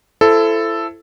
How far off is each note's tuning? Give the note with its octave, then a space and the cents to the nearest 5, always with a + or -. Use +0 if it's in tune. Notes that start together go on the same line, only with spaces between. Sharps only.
E4 +30 A4 +0 C5 +0